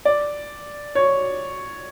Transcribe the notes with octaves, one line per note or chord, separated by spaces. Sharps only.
D5
C#5